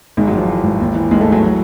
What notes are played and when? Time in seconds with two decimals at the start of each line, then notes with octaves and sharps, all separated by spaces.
0.17 G#1 G#2 G#3
0.27 F#3
0.33 G#1
0.38 F3
0.49 E3
0.64 G#1
0.80 D#2
0.95 E3
1.11 D#2 G#2 G#3
1.21 A2 A3
1.27 E3
1.32 F#3
1.43 F#3